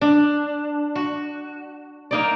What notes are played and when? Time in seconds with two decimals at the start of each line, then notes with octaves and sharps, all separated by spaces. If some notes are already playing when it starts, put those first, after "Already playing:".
0.01 D4
0.95 F#4
2.11 A#3 D#4 D5